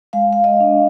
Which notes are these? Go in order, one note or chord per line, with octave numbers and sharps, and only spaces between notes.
G#3 F5
F5
D#5
D4